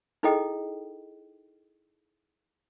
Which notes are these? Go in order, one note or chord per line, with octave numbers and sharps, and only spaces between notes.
D#4 E4 G#4 A4 D#5 G5